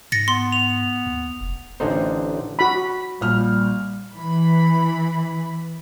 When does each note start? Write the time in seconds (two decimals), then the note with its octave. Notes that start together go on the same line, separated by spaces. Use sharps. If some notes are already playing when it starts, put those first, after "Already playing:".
0.12 G#2 A6 A#6 C#7
0.28 B3 C6
0.52 F7
1.06 D#2
1.41 F1
1.80 A1 D3 D#4 C5
2.59 F#4 B5
3.21 A#1 G3 F6
4.14 E3 B5